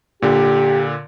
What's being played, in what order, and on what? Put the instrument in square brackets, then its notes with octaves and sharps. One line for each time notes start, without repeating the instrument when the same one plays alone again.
[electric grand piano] A#2 D3 [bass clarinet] G4